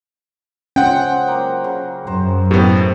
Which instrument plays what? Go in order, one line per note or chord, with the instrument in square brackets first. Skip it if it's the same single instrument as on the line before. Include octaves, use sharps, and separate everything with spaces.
[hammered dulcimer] G#3 F4 C5 [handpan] C#4 [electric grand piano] F#5 G5
[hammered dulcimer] F#3 A#3
C#3
[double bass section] F#2 [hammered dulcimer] C5 A#5
[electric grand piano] A2 B3 [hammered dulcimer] C3 A4 D#5 [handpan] G4